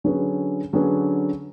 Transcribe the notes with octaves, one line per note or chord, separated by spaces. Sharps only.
D3 F#3 C#4 G#4 B4
D3 F#3 C#4 G#4 B4